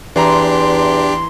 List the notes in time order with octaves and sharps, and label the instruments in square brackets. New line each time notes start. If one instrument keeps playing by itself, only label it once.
[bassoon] E2 [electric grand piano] E3 A#5 [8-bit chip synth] D4 G4 [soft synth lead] C6